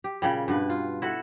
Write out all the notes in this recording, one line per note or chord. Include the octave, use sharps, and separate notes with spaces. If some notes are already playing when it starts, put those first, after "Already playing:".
G4
A#2 C#3 G3
G2 B2 B4
F4
E4 F#4 A4